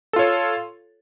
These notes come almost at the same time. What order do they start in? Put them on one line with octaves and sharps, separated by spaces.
A4 F4 C#5